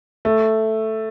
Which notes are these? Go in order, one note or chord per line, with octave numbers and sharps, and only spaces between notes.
A3